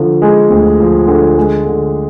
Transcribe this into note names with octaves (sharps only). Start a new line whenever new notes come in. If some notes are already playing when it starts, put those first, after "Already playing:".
Already playing: D3 F3
G#3
D2
F3
D3
G#3
D3